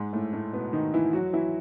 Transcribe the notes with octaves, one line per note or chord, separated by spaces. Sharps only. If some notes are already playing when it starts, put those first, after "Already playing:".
Already playing: G#2 G#3
A2 A3
A2 A3
B2 B3
D#3 D#4
E3 E4
F#3 F#4
E3 E4